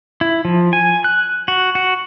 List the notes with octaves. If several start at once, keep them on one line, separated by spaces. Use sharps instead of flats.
E4
F3
G#5
F#6
F#4
F#4